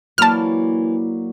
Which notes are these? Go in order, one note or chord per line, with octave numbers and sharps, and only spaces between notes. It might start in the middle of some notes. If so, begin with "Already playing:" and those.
E3 F#3 A#3 D5 A5 F6